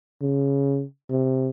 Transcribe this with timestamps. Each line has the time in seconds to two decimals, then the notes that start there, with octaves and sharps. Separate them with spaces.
0.21 C#3
1.10 C3